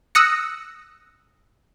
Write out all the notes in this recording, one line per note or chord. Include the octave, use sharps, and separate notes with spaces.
D#6 E6 F#6 A#6 C#7